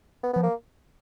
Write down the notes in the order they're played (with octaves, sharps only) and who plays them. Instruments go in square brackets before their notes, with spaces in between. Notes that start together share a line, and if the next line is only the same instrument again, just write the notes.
[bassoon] B3
[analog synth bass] F3 [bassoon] B3
[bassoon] A#3